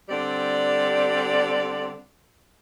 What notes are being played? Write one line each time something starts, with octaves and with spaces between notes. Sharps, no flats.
D3 G3 C4 D5